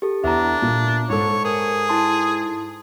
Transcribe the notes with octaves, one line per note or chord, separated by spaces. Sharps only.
G4 A4
E2 D4 E5 A#5
A#2
G#2 A4 C#5
G#4 A#4
E4 A5 C6